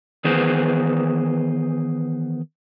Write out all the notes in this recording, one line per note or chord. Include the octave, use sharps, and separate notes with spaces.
D#3 E3 B3 G#4 B4 C5